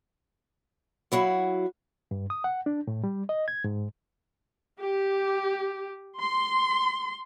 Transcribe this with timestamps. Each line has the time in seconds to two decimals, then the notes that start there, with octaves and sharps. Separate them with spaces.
1.12 F#3 E4 F#4 F5
2.11 G2
2.30 D#6
2.44 F#5
2.66 D4
2.87 A2
3.04 G3
3.29 D#5
3.48 G#6
3.64 G#2
4.80 G4
6.18 C6